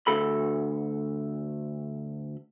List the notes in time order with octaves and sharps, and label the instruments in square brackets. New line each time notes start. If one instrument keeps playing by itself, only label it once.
[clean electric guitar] D2 A4 B5